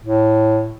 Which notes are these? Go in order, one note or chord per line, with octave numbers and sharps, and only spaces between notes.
A2